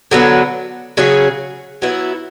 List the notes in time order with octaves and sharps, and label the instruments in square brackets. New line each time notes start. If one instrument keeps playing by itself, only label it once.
[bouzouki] D3 F#3 B3
C#3 F#3 C#4 G#4
F#3 B3 E4